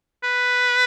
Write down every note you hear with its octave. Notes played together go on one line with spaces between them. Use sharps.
B4